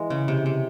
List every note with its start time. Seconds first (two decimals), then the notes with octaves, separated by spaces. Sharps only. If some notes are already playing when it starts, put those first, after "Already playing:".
Already playing: E3 G#3
0.10 C#3
0.28 C3
0.46 C3